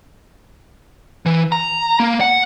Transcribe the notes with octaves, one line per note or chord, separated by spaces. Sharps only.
E3
A#5
A#3
F#5